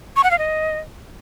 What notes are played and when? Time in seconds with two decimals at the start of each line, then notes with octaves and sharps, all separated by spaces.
0.16 C#6
0.24 F#5
0.31 F5
0.38 D#5